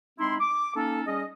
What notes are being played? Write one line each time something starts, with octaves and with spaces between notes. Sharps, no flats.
G#3 C4 D#4 E4 B5 C6
D6
A#3 C#4 D#4 A4
G3 C#4 G#4 D#5